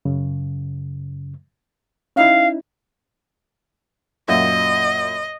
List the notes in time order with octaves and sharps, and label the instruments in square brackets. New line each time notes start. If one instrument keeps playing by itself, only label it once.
[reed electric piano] F#2 C#3
[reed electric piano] C#4 D#4 E4 [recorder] F5
[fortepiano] F#2 A#2 E5 [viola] D#5